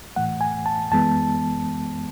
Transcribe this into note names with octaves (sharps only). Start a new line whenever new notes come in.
A2 E3 A3 F#5
G#5
A5
F#2 E3 G#3 B3 A5